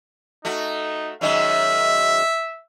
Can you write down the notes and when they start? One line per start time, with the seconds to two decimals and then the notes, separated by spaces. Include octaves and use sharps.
0.45 A3 D#4 F#4
1.21 F#2 D#3 G#3 E5